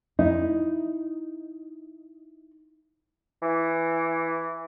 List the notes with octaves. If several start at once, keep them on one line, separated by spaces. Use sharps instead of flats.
D#4 E4
E3